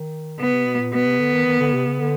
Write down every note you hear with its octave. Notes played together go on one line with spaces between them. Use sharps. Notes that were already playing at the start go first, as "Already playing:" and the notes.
Already playing: D#3
C#3 B3
C3
B2
A#2
B2 B3
C3
D3
D#3
D#3
D3
C3
C#3
D3